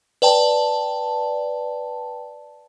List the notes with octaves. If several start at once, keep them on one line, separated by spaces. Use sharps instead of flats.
B4 D5 G5 A5